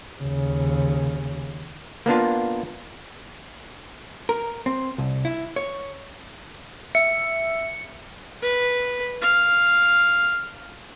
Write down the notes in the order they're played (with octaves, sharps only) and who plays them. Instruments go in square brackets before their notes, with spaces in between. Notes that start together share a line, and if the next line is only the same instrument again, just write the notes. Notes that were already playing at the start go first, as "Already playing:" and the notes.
[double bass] D#2 C#3
[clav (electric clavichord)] A#3 B3 D4 F4
[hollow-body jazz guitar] A#4
C4
C2
E4
C#5
[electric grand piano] E5 [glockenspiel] C#7
[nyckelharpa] B4
F5